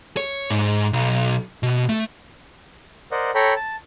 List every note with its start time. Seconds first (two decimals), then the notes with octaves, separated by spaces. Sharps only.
0.17 C#5
0.50 G#2
0.93 B1
1.63 B2
1.89 A3
3.11 A#4 C5 D5 D#5 F#5
3.35 A4 C#5 G5 A#5 B5
3.56 A5